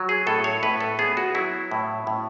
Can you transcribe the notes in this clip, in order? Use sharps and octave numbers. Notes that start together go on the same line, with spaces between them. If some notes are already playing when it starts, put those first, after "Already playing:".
Already playing: F#3
G#4
A2 A4
C#5
A2 B4
A4
B3 G#4
F#4
F#3 E4
A2
A2